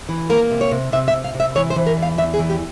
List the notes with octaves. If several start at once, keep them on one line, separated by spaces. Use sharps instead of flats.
E3
A#3 A#4
C3
C#5
C3
C3 E5
E5
C3
F5
C3
E5
E3 C#5
C5
E3
A#4
E2
F5
E2 E5
G#4
E3
G4